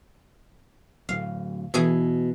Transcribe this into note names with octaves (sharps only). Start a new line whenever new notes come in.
D1 F5
B2 E3 G#4 G#5